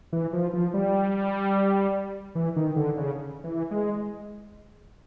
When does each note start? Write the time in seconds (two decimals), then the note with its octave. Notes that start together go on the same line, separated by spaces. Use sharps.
0.13 E3
0.33 F3
0.53 F3
0.74 G3
2.35 E3
2.56 D#3
2.76 D3
2.97 C#3
3.44 E3
3.71 G#3